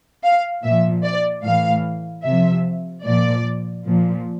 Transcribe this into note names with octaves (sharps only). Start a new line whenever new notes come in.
F5
A#2 F3 E5
D5
A2 E3 F5
C3 F3 E5
A#2 F3 D5
A#2 F3